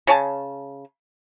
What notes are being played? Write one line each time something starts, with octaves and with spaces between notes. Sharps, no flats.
C#3 C#5 G#5 A5